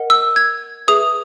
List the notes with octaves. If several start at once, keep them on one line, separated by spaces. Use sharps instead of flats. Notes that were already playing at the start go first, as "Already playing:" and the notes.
Already playing: A#4 D#5 F#5
E6
G#6
G#4 B4 E5 D#6